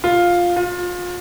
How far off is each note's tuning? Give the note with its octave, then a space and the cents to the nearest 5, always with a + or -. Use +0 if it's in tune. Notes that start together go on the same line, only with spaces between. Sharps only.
F4 +5
F4 +30